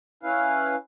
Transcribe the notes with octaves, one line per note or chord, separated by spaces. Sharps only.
C#4 E4 B4 F5